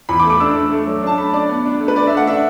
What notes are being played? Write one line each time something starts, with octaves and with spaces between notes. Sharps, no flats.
E2 B5
D6
A3
D6
D4 E6
A3
A3
F#3
D4 A5
A3 B5
D4 D5
B3
D4
A3
B4
D4 D5
E5
A3
F#5
D4 E5